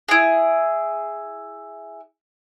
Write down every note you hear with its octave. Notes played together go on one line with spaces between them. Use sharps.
E4 G#4